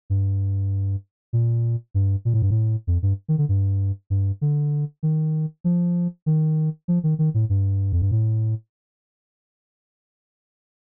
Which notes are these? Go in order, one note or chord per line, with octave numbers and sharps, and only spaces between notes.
G2
A#2
G2
A#2
A2
G2
A2
F2
G2
D#3
D3
G2
G2
D3
D#3
F3
D#3
F3
D#3
D#3
A2
G2
F2
G2
A2